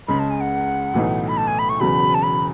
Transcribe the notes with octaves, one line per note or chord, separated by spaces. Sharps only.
C#2 C#3 G#3 B5
A5
G#5
F#5
B1 A2 E3 A3 D#4
B5
A5
G#5
B5
C#6
E1 E2 C#3 F#3 B5
A5
B5